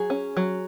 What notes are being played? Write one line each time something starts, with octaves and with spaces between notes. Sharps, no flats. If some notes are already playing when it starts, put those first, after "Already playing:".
Already playing: F#3 G#4
C#4
F#3